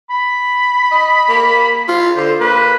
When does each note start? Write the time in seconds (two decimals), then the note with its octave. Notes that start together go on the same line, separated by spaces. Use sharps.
0.10 B5
0.91 D#5
1.28 A#3
1.88 F4
2.16 D3 C5
2.40 A#3 B4